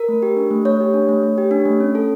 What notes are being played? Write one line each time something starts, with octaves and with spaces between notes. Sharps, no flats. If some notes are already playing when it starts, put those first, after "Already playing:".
Already playing: A#4
A3
G4
D4
A3
A3 C#5
G4
D4
A3
A3
G4
D4
A3
C#4
A4